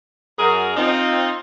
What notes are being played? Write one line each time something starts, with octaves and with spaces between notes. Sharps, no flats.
F#2 G#4 A#4
C4 D#4 F4